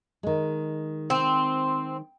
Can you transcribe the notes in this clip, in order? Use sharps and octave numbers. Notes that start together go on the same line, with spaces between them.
D#3 G#3
C4